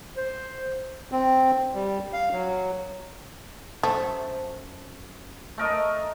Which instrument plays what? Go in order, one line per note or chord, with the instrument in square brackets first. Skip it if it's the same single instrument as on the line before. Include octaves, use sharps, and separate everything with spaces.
[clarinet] C5
[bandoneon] C4
G3
F5
F#3
[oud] F#2 C5 [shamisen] A3
[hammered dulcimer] A3 A#4 D#5